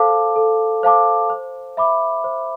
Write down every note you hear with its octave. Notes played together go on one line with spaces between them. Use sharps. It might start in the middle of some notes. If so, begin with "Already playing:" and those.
Already playing: A4 C5 F5 A5 D6
A4
C5 F5 A5 D6
C5
E5 B5 D6
C5